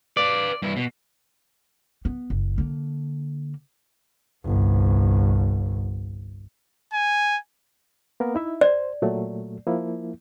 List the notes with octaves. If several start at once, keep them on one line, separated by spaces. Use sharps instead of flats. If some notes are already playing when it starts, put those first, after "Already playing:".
B4 D5 F5
G2 E4
B2
B3
F#1
D3 A#3
G1 C2
G#5
A#3 B3 A#4
D#4 E4 E5
C5 D5
A#2 F#3 A3
F3 A#3 E4